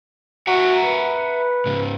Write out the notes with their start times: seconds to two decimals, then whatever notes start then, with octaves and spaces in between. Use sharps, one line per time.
0.47 F#4 E5 F#5 A#5
0.84 B4
1.66 G#2 C#3